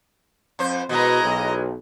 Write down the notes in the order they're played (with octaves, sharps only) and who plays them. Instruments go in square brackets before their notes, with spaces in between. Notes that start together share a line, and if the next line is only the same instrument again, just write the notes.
[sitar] F2 C5
[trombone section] B2 [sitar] E3 G#3 [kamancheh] D#5 A#5
[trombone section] B1